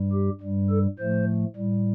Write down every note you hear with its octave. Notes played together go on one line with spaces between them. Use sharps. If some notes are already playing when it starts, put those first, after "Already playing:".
Already playing: G2 G3
G4
G2 G3
A4
A2 F3 A3 C5
A2 G3